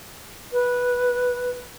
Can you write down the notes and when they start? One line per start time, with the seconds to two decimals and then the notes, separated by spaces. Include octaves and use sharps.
0.53 B4